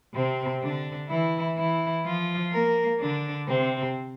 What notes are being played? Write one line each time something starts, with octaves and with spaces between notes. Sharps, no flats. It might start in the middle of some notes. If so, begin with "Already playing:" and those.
C3 C4
D3 D4
E3 E4
E3 E4
F3 F4
A#3 A#4
D3 D4
C3 C4